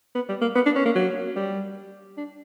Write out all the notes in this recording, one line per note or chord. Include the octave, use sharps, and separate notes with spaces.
B3
G3
A#3
B3
D4
C#4
A#3
F#3
G3
D4